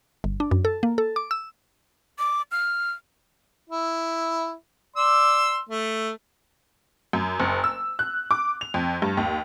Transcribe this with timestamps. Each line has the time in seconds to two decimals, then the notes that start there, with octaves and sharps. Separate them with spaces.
0.24 G1
0.40 D4
0.51 F#2
0.65 A4
0.83 A#3
0.98 A4
1.16 D6
1.31 E6
2.19 D6
2.51 F6
3.70 E4
4.96 D5 C6 E6
5.69 A3
7.13 F#2
7.40 F#1
7.64 E6
7.99 F#6
8.31 D6
8.61 F7
8.74 F2
9.02 G2
9.17 D#2